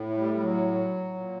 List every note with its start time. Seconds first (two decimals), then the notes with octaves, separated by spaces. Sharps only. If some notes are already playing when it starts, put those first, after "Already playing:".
Already playing: A2
0.09 A3
0.17 G3
0.34 G3
0.40 F#3
1.14 A#2